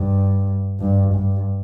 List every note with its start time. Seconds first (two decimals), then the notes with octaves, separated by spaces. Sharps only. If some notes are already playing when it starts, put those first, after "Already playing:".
Already playing: G2
0.80 G2
1.14 G2